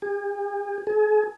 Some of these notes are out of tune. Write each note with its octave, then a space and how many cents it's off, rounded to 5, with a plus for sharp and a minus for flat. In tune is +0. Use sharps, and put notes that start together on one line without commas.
G#4 -45
G#4 +40